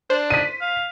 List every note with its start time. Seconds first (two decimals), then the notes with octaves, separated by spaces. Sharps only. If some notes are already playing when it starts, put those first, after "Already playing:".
0.10 D4 C5
0.30 B6 D#7
0.61 F5